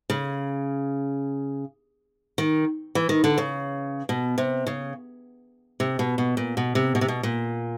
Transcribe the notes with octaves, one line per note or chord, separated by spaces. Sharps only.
C#3
D#3
E3
D#3
D3
C#3
B2
C3
C#3
C3
B2
B2
A#2
B2
C3
B2
C3
B2
A#2